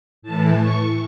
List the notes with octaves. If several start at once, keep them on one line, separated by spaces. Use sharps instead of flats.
A2 E3 A5
C#6